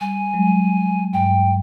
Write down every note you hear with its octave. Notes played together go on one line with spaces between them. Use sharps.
G3 G#5
F#3 G#3
G2 G5